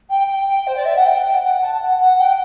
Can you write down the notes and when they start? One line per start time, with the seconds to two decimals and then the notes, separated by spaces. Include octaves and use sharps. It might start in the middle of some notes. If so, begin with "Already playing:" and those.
0.10 G5
0.29 G5
0.67 C5
0.76 D5
0.85 E5
0.96 F#5
1.05 G5
1.24 G5
1.43 F#5
1.62 A5
1.81 F#5
2.00 F#5
2.19 G5